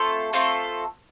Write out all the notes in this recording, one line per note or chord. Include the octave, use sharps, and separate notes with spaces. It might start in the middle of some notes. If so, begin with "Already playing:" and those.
Already playing: A3 C4 F4 A4 C6
A3 C4 F4 A4